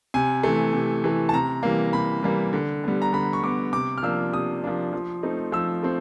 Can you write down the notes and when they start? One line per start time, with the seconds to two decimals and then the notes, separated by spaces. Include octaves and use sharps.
0.14 C3 G#5
0.43 E3 A3
0.73 C3
1.04 E3 A3
1.29 A5
1.34 C3 A#5
1.63 E3 G3 A#3
1.93 C3 B5
2.23 E3 G3 A#3
2.53 D3
2.84 G3 B3
3.02 A#5
3.13 D3 B5
3.33 C#6
3.43 G3 B3 D6
3.73 C3 D6
3.98 F6
4.03 F3 A#3 D4 E6
4.33 C3 D#6
4.64 F3 A#3 D4
4.93 F3
5.23 A3 C4 D#4
5.52 F3 E6
5.83 A3 C4